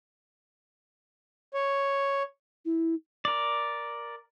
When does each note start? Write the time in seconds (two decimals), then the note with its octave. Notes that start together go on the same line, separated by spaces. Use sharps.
1.54 C#5
2.65 E4
3.25 A#4 D5